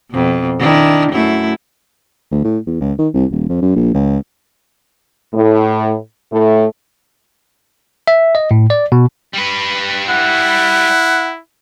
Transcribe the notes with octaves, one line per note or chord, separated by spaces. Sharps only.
F2 B2
D#3 D4 E4
F#2 A3 E4
D2
A2
E2
C#2
D#3
C2
D#1
F2
F#2
A#1
C#2
A2
A2 A3
E5
D#5
A2
D5
B2
G3 B4
E4 F#5